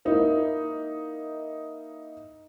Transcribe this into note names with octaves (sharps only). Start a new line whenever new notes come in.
A#3 D#4 E4